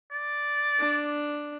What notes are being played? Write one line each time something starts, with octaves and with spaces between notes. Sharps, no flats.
D5
D4